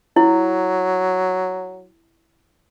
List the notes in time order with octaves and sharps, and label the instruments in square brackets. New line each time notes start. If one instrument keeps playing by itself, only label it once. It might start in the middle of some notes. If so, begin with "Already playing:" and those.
[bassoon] F#3 [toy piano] E4